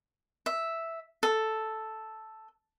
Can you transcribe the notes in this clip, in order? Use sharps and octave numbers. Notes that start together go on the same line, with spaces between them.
E5
A4